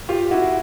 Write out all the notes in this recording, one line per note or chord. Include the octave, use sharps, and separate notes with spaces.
F4 G4
E4 F#4